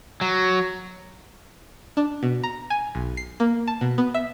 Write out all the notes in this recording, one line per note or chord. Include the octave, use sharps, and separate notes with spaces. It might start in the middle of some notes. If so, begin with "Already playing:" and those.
F#3
D4
B2
A#5
G#5
B1
C7
A#3
A5
B2
B3
E5